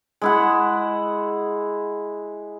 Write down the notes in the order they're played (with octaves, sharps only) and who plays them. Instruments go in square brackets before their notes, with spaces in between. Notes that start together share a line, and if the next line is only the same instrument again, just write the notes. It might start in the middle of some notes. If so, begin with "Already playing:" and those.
[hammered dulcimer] G#3 E4 F#5